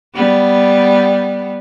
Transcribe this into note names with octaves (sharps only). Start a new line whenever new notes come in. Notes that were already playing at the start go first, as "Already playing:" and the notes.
G3 B3